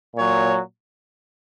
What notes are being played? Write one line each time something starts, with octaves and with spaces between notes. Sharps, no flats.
A#2 F#3 C#5